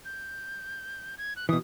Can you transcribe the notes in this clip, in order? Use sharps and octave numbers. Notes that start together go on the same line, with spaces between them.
G6
G#6
F#6
B2 E3 D#6